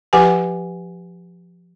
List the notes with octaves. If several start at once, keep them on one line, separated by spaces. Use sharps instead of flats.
F3 G4 B4 F#5 G#5